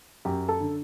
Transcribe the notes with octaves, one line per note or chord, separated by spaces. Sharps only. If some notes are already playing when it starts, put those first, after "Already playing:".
F#2 G4
A4
D3